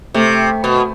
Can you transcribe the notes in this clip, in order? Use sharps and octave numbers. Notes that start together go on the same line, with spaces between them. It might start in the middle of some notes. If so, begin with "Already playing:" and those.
C3 A3
B2